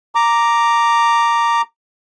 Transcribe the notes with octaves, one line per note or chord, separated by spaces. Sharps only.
A#5 D6